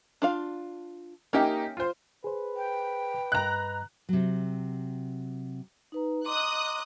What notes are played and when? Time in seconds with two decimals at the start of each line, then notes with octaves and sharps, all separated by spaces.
0.22 D4 F4 F5
1.33 A#3 C#4 D#4 G4 E5 G5
1.77 F4 C5
2.24 G#4 B4 C5
2.56 G5
3.32 G2 D#5 A#5 F#6
4.09 C3 F#3
5.92 D#4 B4 A#5
6.25 D#5 A#5 C6 D6 D#6 F#6